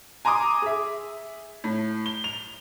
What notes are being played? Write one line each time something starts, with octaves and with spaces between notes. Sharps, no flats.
G#5 A#5 C6 D6 D#6
G#4 E5
A2
G7
F7